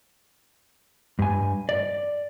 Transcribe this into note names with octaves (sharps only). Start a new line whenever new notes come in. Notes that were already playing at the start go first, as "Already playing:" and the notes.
G2 G#5
D5